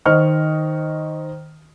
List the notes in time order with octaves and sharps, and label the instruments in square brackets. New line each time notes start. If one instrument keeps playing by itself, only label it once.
[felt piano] D#3 C5 D#5 C#6 F6